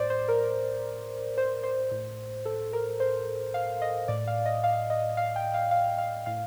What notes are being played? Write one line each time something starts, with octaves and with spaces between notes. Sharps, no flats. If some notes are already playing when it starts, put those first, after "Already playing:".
Already playing: A2 C5 D5
C5
A#4
C5
C5
A2
A4
A#4
C5
F5
D#5
A2 D5
F5
D#5
F5
D#5
F5
G5
F5
F5
F5
A2 F5